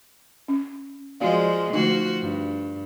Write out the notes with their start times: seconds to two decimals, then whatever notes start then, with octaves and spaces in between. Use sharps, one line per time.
0.48 C#4
1.20 F3 G#3 F#4 D5 F5
1.73 D3 F3 A3 D#4 F#4
2.21 G2